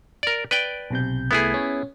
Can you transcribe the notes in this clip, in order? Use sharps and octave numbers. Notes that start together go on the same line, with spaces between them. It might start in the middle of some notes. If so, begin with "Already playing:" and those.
A#4 D5
B4 D5 G5
B1 C3 G6
C2 A3 B3 E4 G#4 E5
C#4